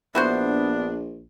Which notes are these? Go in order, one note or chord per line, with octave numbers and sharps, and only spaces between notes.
A#1 B3 D4 E4 F#4 C5